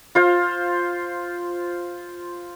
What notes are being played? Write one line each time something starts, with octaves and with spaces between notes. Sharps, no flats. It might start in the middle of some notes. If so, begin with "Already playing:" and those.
F4 C5 F5